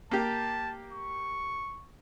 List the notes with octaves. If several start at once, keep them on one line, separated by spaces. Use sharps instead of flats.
A#3 G4 A5
C#6